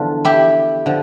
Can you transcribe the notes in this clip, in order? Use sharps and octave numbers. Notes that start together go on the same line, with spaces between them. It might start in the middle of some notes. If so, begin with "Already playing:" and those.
Already playing: E2 D3 F3 D4 F4
E4 G4
D3 F3